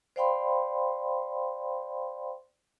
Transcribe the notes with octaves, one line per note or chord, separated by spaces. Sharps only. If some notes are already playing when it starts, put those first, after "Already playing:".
C5 D5 F5 G5 B5 C6